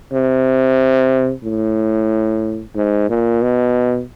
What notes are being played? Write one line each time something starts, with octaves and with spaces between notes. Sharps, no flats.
C3
A2
G#2
A#2
B2